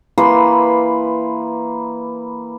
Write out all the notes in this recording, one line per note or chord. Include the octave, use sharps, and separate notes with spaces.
E3 A#3 B4 C6